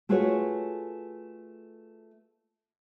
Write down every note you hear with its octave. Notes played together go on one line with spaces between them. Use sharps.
A3 F4 F#4 G#4 B4 C#5